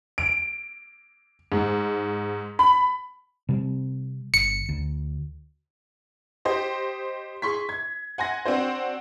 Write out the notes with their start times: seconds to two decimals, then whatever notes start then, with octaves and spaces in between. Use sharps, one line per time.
0.18 D7
1.52 G#2
2.59 B5
3.49 C3 G3 C4
4.34 G1 C#7
4.69 D2
6.45 G4 C5 D#5
7.42 G#4 C6 C#6 B6
7.69 G#6
8.18 F#5 G#5 C6 A#6
8.45 C4 D4 F#4 C5